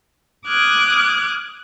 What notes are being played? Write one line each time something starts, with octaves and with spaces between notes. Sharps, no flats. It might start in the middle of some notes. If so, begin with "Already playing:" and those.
D6 D#6 F6 F#6 G#6